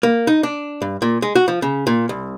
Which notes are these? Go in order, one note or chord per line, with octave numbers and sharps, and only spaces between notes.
A#3
D#4
D4
G2
A#2
G#3
F#4
F3
C#3
A#2
C2